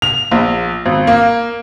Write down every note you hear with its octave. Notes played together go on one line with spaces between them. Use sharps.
F7
A#1
G#1
A#3